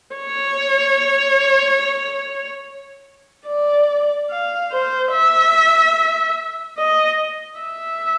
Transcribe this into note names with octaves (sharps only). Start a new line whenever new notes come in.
C#5
D5
F5
C5
E5
D#5
E5